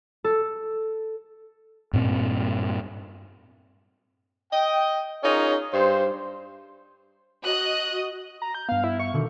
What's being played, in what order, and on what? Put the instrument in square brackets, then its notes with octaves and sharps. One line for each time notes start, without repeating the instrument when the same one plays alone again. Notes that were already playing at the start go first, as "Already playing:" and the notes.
[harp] A4
[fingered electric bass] G2 A#2 C4
[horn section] D#5 G5
C#4 D#4 F4 G#4 A#4 C#5
G2 C5
[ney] F#4 [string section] D#5 [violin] F#6
[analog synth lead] A#5
G6
[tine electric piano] G2 B3 [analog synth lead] F5
[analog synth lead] E4
C#6
[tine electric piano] B2 D3 D#3